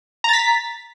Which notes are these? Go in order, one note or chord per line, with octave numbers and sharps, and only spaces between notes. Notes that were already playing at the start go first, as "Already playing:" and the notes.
A#5 A6 B6